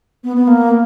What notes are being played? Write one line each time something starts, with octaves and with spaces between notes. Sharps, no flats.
B3
B3
A#3